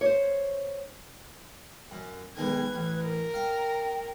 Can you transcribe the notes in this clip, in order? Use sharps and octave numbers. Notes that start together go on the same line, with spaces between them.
C5 C#5
F#2
B1 D#3 G#3 B4 G#6
A1
A#4
F5 G5